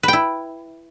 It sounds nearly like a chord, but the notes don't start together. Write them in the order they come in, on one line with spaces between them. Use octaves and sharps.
B4 G5 E4